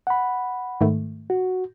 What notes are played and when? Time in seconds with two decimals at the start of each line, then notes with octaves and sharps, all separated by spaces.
0.07 F#5 B5
0.81 G#2 D#3 A3
1.30 F#4